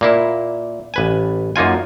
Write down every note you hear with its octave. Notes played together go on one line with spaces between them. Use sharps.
A#2 A#3 E4
A1 B4 G#5
F#2 A#3 D#4 F4 G#5